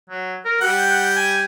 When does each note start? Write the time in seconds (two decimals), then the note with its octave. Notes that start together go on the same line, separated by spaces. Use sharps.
0.10 F#3
0.45 A#4
0.61 G3 F#5 G5
0.89 F#5
1.16 G#5